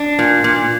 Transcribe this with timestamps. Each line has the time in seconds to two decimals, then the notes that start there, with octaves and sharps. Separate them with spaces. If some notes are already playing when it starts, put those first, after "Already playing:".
Already playing: D4
0.19 A#2
0.44 A#2